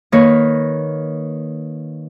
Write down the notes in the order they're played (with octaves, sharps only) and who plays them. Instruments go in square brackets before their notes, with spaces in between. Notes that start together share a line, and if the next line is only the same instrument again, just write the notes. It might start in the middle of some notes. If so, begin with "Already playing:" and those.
[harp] D#3 A#3 A#4 B4 C#5